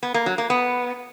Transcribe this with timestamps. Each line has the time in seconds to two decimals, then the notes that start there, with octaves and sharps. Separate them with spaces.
0.03 B3
0.14 A#3
0.26 F#3
0.38 A#3
0.50 B3